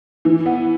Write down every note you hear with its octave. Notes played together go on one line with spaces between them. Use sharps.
E3
B3